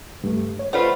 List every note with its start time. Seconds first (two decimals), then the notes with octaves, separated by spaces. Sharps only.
0.21 C#2 G2 A3
0.59 C#5
0.73 A3 F4 B4 C5 D5 F#5